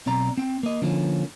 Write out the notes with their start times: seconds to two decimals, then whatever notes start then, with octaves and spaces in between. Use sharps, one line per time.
0.06 B1 C4 D5 A#5
0.37 C4 G5
0.63 A#3 D#5
0.82 D3 F3 A#3 C#4